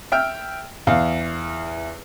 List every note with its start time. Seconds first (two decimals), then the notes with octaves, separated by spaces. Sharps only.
0.12 E5 G5 F6
0.87 E2 F5